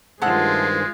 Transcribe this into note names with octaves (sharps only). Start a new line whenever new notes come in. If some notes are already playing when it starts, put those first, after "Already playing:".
G2 D#3 G#3 A3 F4 G#4 C5 F#5